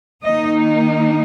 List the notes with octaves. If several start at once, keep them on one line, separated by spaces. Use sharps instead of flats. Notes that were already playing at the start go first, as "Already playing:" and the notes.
D#3 A#3 D#4 D#5